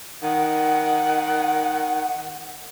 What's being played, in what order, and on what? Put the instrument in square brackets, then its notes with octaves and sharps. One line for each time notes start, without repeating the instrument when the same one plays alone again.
[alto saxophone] D#3 [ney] F#5